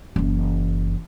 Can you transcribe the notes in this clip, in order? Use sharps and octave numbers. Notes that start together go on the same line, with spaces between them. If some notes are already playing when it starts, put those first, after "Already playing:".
F#1 E3